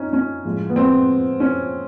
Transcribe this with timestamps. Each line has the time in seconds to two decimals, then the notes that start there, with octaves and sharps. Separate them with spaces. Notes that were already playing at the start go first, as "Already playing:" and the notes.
Already playing: C#4 D#4
0.13 C#4
0.45 A2 F3 G#3
0.69 B3
0.76 C4
1.40 C#4